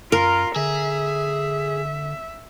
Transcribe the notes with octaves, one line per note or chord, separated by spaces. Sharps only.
F#2 F4 A#4
D3 G#4 E5